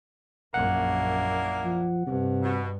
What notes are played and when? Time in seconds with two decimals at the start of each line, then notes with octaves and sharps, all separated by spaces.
0.54 A#1 F#2 A#3 D4 E4 F#5
1.64 F3
2.07 G2 C3
2.43 B2